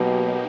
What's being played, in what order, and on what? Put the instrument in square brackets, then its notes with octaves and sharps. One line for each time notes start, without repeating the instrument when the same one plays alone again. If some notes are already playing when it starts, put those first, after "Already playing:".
Already playing: [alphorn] B2 [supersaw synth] F#3 A#3 D#4 G4